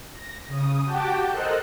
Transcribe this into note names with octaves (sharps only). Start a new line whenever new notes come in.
A#6
C#3 D#6
F#4 G4 F#5 G5 A5 D6
A4 A#4 C5 D#5 A5 F#6